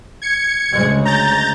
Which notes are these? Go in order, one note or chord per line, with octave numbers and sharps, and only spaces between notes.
G#6 C#7
D2 C#3 G#3
A#5 G6 A6